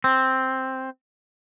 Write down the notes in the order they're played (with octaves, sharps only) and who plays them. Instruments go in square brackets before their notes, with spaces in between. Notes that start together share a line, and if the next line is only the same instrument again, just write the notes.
[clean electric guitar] C4